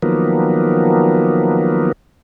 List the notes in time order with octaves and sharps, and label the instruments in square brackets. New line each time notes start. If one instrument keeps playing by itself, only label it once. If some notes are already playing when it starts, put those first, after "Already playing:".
[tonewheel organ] D#3 F3 F#3 A#3 B3